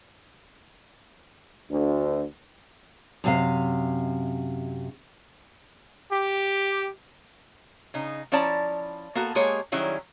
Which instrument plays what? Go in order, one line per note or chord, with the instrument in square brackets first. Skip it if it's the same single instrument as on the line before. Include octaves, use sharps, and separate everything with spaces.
[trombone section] D2
[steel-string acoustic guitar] F#2 C3 F5
[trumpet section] G4
[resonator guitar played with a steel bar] C#3 D#4
F3 C#4 E4 D5 A5 A#5
A#3 B3 F#4 A4
G#3 A#3 G4 G#4 C#5
D#3 F#3 G3 C#4 E4 G#4